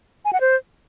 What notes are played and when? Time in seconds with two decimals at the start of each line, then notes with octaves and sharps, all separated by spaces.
0.25 G#5
0.33 F#5
0.41 C5